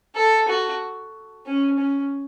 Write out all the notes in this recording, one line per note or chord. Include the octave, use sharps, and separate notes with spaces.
A4
F#4
C#4
C#4